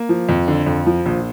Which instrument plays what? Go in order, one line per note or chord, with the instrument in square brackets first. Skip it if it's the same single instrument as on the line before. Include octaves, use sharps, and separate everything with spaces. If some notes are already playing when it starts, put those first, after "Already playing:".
Already playing: [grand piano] A#3
F3
F2
D3
F2
F3
A#1